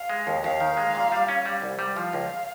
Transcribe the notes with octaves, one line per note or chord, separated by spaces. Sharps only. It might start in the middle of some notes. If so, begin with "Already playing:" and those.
Already playing: F5
G#3
D#2
D#2 F5
D#3
G#3
A#2
G3
C#4
G3
C2
G3
F3 F5
C#2